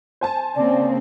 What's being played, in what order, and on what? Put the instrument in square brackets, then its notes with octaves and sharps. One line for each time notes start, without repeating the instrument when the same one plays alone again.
[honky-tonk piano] C5 G#5 A5
[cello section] C#3 A#3 C4 [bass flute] D5